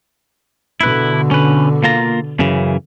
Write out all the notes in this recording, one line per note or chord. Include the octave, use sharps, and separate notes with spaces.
B2 D3 E4 B4
C#4 B4
A#3 F4 A#5
F#2 C#3 E3